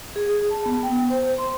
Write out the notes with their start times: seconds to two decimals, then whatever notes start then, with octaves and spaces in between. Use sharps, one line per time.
0.16 G#4
0.50 A5
0.66 B3
0.83 G5
1.10 C5
1.38 C6